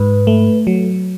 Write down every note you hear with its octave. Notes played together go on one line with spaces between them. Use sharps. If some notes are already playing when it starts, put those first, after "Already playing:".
Already playing: G#2 B4
A3
F#3